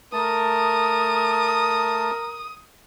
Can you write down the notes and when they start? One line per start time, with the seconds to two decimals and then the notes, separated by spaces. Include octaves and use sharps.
0.13 A3 A#4 A5 D#6